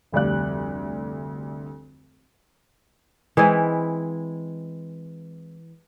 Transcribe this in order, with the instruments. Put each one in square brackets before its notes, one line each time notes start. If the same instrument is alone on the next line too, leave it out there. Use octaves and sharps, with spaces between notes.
[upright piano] F1 D2 G3 D5 F#6
[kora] E3 G#3 C4 E4